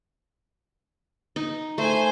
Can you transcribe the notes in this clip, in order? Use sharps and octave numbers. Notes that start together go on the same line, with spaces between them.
D#4
A3 C5 G#5